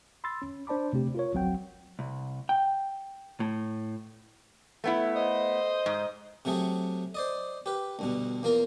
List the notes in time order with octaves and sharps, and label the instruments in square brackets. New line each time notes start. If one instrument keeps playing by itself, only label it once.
[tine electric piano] B5 C6 E6 A6
C#4
D4 C5 D5 A5 B5 D6
C3 A3 C4 G4
F4 A#4 C#5
G1 C2 F#3 C4 F#5 G5
[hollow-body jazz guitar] C2
G5
A2
[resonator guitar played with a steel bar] A3 B3 E4
[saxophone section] C5 D#5
[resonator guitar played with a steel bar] G#2
[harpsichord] C3 F#3 A3 G#4
C5 D5 D#5
G4 B4
D2 G2 B2
E2 A#3 F4 A#4